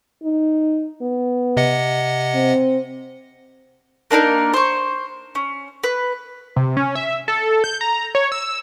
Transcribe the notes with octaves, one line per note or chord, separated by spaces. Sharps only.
D#4
B3
C3 D#5 F#5
C4
A#3 D4 D#4 A#4
C5 C#6
C#4
B4
C3
C#4
E5
A4
G6
A#5
C#5
E6